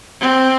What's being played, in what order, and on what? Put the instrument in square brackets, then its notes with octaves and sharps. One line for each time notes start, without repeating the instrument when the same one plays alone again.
[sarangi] C4